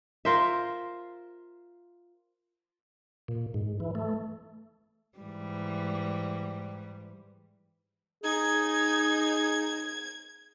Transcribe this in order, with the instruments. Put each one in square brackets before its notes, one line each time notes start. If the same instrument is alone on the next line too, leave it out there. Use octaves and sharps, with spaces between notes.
[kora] F4 A#4 C5 E5
[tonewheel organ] A#2
G#2
E3
A3
[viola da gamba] G#2 E3 G3
[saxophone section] D#4 [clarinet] G#4 [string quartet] G#6